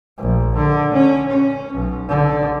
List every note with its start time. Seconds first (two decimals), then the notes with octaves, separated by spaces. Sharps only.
0.18 A#1
0.56 D3
0.94 C#4
1.30 C#4
1.74 B1
2.08 D3